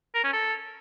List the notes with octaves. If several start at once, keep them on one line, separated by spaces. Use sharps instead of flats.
A#4
C#4
A4